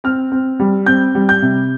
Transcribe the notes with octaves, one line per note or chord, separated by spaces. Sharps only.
C4 F6
C4
G3
C4 G6
G3
G6
C3